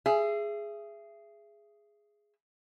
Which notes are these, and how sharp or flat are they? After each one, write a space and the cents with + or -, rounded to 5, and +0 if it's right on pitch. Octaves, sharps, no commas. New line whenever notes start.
G#4 +0 E5 +30